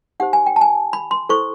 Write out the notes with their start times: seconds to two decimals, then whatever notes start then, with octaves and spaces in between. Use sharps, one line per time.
0.20 D#4 G4 C5 F#5
0.33 G#5
0.46 G5
0.56 A5
0.61 G#5
0.93 B5
1.11 C6
1.29 E4 A4 C5 C#6